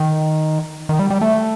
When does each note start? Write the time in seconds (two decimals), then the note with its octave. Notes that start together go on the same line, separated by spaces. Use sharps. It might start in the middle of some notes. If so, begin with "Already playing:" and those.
Already playing: D#3
0.89 D#3
0.99 G3
1.10 G3
1.21 A3